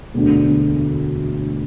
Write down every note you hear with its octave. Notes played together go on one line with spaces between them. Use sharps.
E1 D2 D3